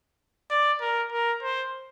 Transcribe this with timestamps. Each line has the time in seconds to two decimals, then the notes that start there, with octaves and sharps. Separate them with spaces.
0.50 D5
0.81 A#4
1.12 A#4
1.43 C5